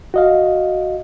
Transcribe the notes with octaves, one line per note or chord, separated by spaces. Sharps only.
F#4 D#5 F5